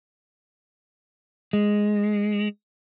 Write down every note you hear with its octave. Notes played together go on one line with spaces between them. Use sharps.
G#3